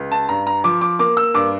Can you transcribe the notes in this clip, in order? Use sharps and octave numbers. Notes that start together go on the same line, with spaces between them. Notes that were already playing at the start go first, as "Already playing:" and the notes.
Already playing: C#2
A5
G2 A#5
A#5
F3 D6
D6
A#3 D6
E6
G2 D6